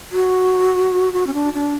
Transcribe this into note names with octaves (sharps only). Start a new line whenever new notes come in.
F#4
F#4
C#4
D4
D4